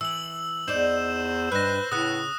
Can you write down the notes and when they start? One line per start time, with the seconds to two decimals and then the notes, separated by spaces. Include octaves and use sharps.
0.01 E3 E6 F#7
0.68 E2 D#4 C5 D5 E7
1.52 G2 D#4 B4 F#6 A#6
1.92 A2 C#3 B3 D#6 F#6